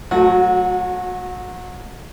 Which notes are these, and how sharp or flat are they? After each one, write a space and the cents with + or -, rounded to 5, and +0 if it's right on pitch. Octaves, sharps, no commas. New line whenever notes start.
F#3 +0 A3 +5 F#4 -30